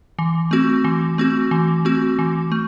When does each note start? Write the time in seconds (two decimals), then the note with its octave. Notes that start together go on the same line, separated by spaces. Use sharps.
0.19 E3
0.51 A3 C4 F#4
0.84 E3
1.18 A3 C4 F#4
1.51 E3
1.85 A3 C4 F#4
2.19 E3
2.52 A3